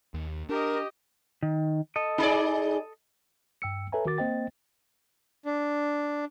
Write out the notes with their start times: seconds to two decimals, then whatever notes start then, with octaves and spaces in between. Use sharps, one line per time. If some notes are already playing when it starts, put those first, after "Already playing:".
0.14 D#2
0.49 D4 G4 A#4 D#5
1.43 D#3
1.96 A4 D#5
2.18 D#4 G#4 D5
3.62 G2 G5 E6 C#7
3.92 A4 B4 C#5 E5 G#5 A#5
4.06 D#3 F#4 A#4 D6 A6
4.18 A#3 C4 C5 D#5 G5 A6
5.45 D4